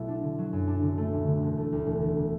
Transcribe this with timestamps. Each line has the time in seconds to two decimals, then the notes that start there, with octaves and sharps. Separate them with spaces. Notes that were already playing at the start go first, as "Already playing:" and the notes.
Already playing: B1 B2 A3 E4
0.08 D4
0.23 D3
0.38 F#3
0.53 F#2
0.67 D4
0.82 D3
0.98 A3
1.13 D2
1.27 D3
1.42 E1
1.58 A3
1.72 D2
1.86 E1
2.01 D2
2.17 D3